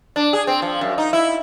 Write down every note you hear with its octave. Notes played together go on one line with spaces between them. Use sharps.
D4
G#4
C4
F3
F#2
D#4
E4